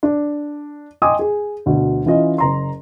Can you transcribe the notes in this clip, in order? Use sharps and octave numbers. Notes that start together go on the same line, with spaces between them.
D4
D#5 G5 G#5 C6 D6 D#6
G#4
D2 B2
E3 C#4 F4 D#5
F#1 A#5 C6